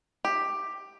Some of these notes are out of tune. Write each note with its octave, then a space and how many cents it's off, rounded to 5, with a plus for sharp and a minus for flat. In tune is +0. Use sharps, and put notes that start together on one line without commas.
G4 +10